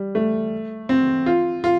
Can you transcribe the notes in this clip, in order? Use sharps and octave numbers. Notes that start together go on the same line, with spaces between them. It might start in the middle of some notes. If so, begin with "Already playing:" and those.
Already playing: G3
A3
C4
F4
F4